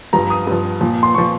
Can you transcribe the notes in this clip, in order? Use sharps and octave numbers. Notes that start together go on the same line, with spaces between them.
G2 F3 A#5
D#6
G2 F3
A#2 F3
C6
A#2 F3 C#6